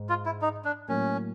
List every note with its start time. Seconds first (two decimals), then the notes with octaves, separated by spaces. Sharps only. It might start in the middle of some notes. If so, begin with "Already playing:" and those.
Already playing: G#2
0.09 F4
0.26 E4
0.42 D#4
0.65 D4
0.88 A2 F#3 A#3 C#4